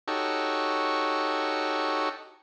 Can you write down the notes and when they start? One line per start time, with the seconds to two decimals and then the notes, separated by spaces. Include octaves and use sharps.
0.08 D#4 F#4 G4 A4 C#5